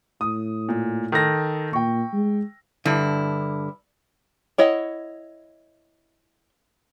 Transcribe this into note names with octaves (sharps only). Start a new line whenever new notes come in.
A2 D#6
A#2
D#3 A4 A#6
A#2 G5 C#6
G#3
G2 D3 E4
E4 C#5 D#5 F#5